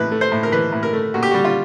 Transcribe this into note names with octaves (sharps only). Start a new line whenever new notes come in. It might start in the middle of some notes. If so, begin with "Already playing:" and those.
Already playing: A2 E3 B4
A3
C5
A2
A#4
E3 B4
A2
A#4
A3
A#2 F#4
G4
G3 F#4
F4